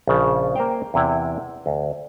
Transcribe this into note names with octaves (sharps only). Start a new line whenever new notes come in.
A#1 C#3 A5
A#3 A#4 C5 F5 G5
E2 C3 E4 G5
D2